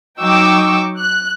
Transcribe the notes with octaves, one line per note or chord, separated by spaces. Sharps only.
F#3 D#4 G5 C#6 D6 E6
F#6